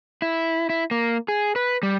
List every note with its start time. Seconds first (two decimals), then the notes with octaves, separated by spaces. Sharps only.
0.22 E4
0.70 E4
0.91 A#3
1.28 G#4
1.56 B4
1.83 G3